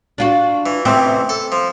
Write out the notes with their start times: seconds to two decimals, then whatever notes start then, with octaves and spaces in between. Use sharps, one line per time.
0.18 D4 F4 F#4
0.66 E3
0.85 A1 C3 E3 C4
1.29 A4
1.52 F3